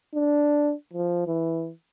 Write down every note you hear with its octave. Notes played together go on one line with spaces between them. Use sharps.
D4
F3
E3